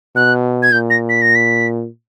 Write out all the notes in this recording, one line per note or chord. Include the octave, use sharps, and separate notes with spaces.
B2 F#6
G#6
A#2 G6
A#6
B6
A#6
B6